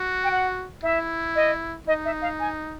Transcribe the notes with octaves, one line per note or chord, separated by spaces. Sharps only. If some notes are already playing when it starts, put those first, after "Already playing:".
Already playing: F#4
G5
F#5
E4 E5
D#5
D#4 D#5
E5
F5
G#5